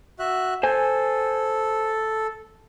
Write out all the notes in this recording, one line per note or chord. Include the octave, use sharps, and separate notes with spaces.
F#4 E5 F#6
A4 C5 G#5